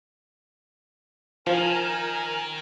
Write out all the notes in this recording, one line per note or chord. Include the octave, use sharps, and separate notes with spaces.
D#3 F3 A#4 G#5